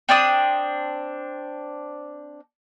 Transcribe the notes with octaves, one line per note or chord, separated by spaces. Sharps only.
C4 D4 A5 D#6